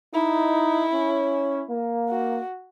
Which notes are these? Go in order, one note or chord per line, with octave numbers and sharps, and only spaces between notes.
D#4 E4
C#4
A#3
F#4